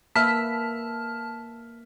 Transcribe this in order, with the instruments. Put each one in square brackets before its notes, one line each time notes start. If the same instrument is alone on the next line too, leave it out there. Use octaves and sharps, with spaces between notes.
[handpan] A#3 B4 E5 [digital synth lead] A5 [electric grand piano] F6 B6